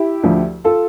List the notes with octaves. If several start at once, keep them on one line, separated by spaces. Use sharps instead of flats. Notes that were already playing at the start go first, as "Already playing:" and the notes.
Already playing: E4 G4
D2 D3 F3
F4 A4